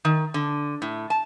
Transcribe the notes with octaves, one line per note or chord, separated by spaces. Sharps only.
D#3
D3
A2
A5